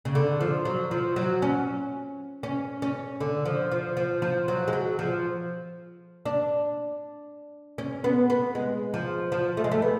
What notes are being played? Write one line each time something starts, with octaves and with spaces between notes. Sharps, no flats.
C#3
D3
F3
F#3
F3
F#3
C#4
C#4
C#4
D3
F3
F3
F3
F3
F#3
G#3
F#3
F3
D4
C#4
B3
B3
G#3
F3
F3
A3
G#3
A3
B3